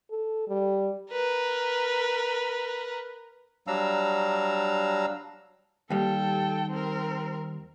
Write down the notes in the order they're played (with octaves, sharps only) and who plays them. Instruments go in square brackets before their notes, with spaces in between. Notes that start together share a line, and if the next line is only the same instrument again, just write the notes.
[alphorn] A4
G3
[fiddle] A#4 B4
[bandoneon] F#3 G3 D4 F5 A#5 E6
[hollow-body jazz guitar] D#2 G3 [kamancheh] A4 G5
[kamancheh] C4 A#4